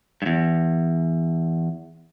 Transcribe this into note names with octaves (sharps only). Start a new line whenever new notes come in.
E2 G2